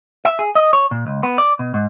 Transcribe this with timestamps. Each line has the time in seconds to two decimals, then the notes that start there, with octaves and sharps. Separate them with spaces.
0.25 E5
0.39 G#4
0.55 D#5
0.73 C#5
0.91 A#2
1.07 C#2
1.23 B3
1.38 D5
1.59 B2
1.74 G#2